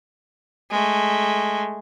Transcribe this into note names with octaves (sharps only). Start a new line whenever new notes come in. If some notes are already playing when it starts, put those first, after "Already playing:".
G#3 A3